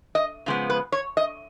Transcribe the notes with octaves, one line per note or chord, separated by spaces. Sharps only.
D#5
C#3 F3 G#3 B3
B4
C#5
D#5